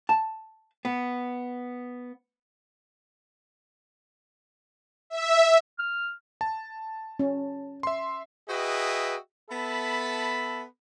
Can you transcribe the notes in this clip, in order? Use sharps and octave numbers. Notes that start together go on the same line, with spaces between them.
A5
B3
E5
F6
A5
C#4
E5 C6
F#4 G#4 B4 D#5 E5 G5
B3 A4 E5 A5 B5